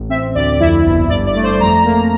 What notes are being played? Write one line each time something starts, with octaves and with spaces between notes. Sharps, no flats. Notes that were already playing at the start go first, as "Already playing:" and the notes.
Already playing: A1
C4 E5
D2 D5
F2 E4
G1
G2 D5
D5
A3
C5
F2 A#5
A#3